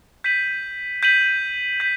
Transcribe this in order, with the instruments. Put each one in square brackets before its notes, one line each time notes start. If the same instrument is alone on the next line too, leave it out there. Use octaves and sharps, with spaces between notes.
[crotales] G6 B6 D#7 F#7
G6 B6 D#7 F#7
G6 B6